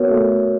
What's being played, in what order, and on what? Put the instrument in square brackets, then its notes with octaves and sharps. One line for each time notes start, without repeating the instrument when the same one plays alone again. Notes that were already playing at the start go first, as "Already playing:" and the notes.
Already playing: [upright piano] B3 [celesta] F#4 A#4 C#5
[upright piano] A3